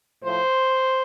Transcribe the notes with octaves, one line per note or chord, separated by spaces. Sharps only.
A2 F3 C5